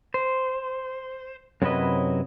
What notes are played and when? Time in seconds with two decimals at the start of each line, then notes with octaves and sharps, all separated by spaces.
0.14 C5
1.62 F#2 C3 F#3 E4 B4 D#5